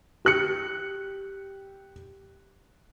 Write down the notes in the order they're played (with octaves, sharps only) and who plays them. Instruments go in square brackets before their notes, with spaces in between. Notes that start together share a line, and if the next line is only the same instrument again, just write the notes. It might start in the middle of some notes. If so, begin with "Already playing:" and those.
[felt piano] G4 F#6 C#7